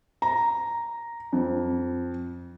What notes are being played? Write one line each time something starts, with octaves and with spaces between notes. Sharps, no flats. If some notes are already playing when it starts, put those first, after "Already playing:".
A#5
F2